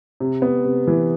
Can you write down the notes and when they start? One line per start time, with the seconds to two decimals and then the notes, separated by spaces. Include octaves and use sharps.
0.20 C3
0.42 B3
0.65 C3
0.87 E3